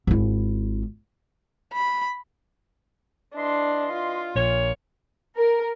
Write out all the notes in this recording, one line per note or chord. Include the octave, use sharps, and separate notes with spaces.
G#1 E4
B5
E3 D4 D#5 C6
F4
A#1 A#2 C#5
A#4